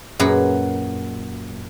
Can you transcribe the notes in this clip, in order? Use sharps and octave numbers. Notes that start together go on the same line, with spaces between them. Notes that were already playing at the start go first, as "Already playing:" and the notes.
F#2 A#2 G#4 B4